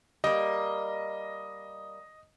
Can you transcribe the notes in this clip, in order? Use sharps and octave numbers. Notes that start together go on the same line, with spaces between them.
G3 A#3 D#5